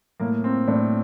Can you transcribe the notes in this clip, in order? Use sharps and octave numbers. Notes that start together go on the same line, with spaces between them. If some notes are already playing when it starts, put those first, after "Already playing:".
A2 A#3
C4
A2 D4